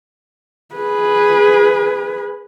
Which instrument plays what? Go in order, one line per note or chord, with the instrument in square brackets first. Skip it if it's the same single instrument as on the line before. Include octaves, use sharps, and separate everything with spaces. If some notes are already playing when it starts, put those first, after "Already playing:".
[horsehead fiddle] G#4 B4